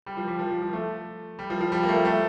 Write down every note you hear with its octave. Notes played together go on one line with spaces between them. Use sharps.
G3
F3
G3
F3
G3
F3
A3
G3
F3
F3
G3
A#3
A3
A3